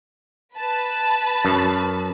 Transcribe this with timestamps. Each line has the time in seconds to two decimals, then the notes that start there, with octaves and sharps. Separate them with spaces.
0.54 B4 A5 B5
1.45 F#2